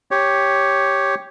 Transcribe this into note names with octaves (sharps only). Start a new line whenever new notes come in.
G4 C#5